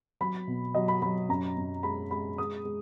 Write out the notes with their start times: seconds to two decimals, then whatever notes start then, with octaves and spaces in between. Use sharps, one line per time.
0.21 F#3 B5
0.47 B2
0.75 F#3 D#5
0.88 B5
1.02 F#3 B5
1.29 F#2 A#5
1.57 F#2
1.83 G#3 B5
2.11 G#3 B5
2.38 G#3 D#6
2.65 G#3